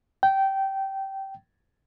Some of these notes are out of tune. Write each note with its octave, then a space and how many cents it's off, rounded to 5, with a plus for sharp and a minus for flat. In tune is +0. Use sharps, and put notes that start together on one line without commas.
G5 -15